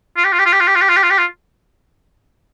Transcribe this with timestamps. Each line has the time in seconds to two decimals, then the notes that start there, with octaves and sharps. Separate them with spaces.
0.17 F4
0.25 G4
0.32 F4
0.39 G4
0.46 F4
0.53 G4
0.60 F4
0.67 G4
0.76 F4
0.82 G4
0.89 F4
0.97 G4
1.03 F4
1.10 G4
1.18 F4